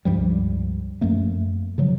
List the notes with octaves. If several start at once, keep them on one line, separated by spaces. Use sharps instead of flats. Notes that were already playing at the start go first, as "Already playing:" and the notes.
C#2 G2 F3 G3
F#2 F3 A3 A#3
C#3 F3 F#3